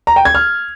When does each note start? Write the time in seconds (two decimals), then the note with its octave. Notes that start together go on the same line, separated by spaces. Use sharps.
0.07 A#5
0.16 G5
0.25 G#6
0.35 F6